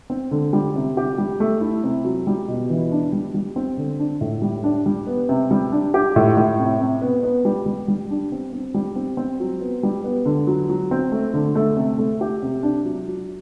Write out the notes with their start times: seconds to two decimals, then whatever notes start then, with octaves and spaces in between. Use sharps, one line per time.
0.10 C4
0.31 D3
0.53 G3
0.76 C3
0.97 G4
1.18 G3
1.40 A3
1.61 E4
1.84 C3
2.05 F#3
2.27 G3
2.48 B2
2.70 E3
2.92 D4
3.13 G3
3.34 G3
3.56 C4
3.77 D3
3.99 D4
4.21 A2
4.42 G3
4.64 D4
4.86 G3
5.07 B3
5.29 C3
5.51 G3
5.72 D4
5.94 G4
6.16 A2
6.37 A2
6.59 C3
6.80 C3
7.02 B3
7.23 B3
7.45 G3
7.66 G3
7.88 G3
8.10 D4
8.32 C4
8.53 C4
8.74 G3
8.96 C4
9.17 C4
9.40 F#3
9.61 B3
9.83 G3
10.04 B3
10.26 D3
10.47 F#3
10.70 F#3
10.91 C4
11.12 A3
11.34 D3
11.55 A3
11.77 C3
11.98 A3
12.21 G4
12.43 C3
12.63 D4
12.85 F#3
13.07 F#3